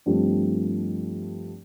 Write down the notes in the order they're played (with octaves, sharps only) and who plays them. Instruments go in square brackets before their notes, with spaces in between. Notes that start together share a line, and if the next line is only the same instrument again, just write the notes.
[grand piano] G2 F3 A3 C4 G4